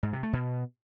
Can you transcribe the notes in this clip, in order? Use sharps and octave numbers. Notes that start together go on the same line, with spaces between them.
G#2
C3
A3
B2